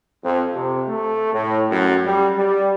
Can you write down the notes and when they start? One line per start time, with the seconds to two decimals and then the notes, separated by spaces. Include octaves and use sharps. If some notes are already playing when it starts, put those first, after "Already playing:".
0.23 F2
0.53 C3
0.88 A3
1.33 A2
1.71 F#2
2.05 G3
2.36 G3